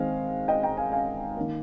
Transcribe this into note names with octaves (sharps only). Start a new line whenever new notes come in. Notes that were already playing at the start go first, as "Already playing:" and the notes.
Already playing: D#3 G#3 C4 F5 G#5
D#5 G5
G5 A#5
F5 G#5
F5 G#5
D#3 A#3